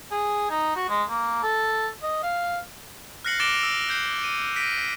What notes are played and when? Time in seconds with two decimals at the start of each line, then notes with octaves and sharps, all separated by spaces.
0.11 G#4
0.50 D#4
0.76 F#4
0.89 G#3
1.09 A#3
1.43 A4
2.03 D#5
2.23 F5
3.25 F6 F#6 A#6 C7 C#7 F#7
3.40 D6 A6 A#6 D7 E7 G7
3.63 E6
3.89 F#6 G6 C7
4.24 D#7
4.56 A#6 B6 D7 D#7